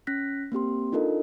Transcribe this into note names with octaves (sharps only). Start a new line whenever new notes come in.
C#4 F#6 A#6 B6
A#3 C4 G4 C6
D4 D#4 F4 A4 A#4 D#5